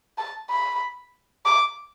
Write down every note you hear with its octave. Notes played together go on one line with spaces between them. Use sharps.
A5
B5
D6